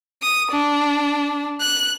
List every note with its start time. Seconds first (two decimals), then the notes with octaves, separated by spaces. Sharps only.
0.22 D#6
0.52 D4
1.61 F#6